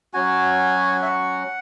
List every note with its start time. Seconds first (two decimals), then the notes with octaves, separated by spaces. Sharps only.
0.14 F#3 C#4 F#4 G#5
1.02 E5
1.06 F#5